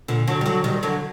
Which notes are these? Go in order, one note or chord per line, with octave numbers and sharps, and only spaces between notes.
A#2 D3
D3 F#3
G3
D3 F#3
D#3 G3
D3 F#3